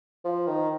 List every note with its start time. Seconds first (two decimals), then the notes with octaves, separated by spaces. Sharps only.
0.24 F3
0.47 D#3